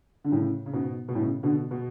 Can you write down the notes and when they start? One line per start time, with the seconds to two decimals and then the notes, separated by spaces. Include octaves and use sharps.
0.24 D3
0.31 A2 C#3
0.66 C#3
0.73 G#2 B2
1.08 B2
1.15 A2 C#3
1.43 B2 D3
1.71 B2